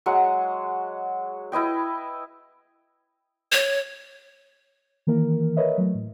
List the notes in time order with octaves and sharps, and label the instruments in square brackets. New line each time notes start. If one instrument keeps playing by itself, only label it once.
[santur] F#3 G#3 F#4 F#5
E4 B4 D#5 G5
[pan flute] C#5
[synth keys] D#3 E3 A#3 A#4
A#4 B4 C#5 D#5 E5
F#3 A3
A2